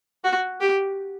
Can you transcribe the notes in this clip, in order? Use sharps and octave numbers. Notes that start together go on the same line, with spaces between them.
F#4
G4